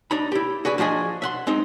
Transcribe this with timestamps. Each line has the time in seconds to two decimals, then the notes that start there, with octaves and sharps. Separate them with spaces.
0.11 D4 D#4 B5
0.32 E4 G4
0.65 F#4 G#4 B4 D5
0.78 F3 D4 F#4 G#4 D#5
1.22 E5 F#5 C6
1.47 G#3 C4 D#4